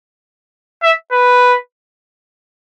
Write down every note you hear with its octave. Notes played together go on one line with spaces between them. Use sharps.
E5
B4